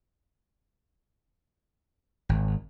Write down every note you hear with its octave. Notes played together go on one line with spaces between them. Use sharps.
G#1